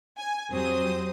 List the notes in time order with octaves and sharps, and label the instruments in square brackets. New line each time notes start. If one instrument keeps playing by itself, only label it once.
[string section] G#5
F2 F#3 C4 G4 C5 D#6